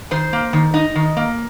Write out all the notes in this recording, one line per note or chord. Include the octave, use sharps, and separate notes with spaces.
D#3 C5
A#3
D#3
D#4 D#5
D#3
A#3